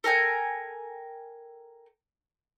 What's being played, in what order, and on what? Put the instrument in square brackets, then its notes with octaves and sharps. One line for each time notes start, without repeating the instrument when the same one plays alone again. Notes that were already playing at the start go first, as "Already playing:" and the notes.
[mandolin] A4 A#4 G5 G#5